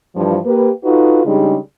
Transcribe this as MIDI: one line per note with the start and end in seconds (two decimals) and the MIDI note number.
0.16 0.38 43
0.16 0.38 52
0.16 0.38 53
0.45 0.70 58
0.45 0.70 67
0.45 0.70 71
0.84 1.24 63
0.84 1.24 65
0.84 1.24 66
0.84 1.24 69
0.84 1.24 71
1.26 1.56 49
1.26 1.56 55
1.26 1.56 56
1.26 1.56 62
1.26 1.56 63